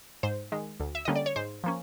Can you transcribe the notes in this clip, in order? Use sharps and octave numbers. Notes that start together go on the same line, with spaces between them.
G#2 C5
D#3 G#3
D2
E5
D3 G3 A#3 C#4 D#5
D5
C#5
G#2 C5
F3 A#3 C#4